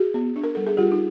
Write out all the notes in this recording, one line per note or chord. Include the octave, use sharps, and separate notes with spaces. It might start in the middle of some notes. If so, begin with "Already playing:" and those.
Already playing: F#4 G#4
B3
D4
A#4
G3 A4
G#4
G3 F4 G4
D#4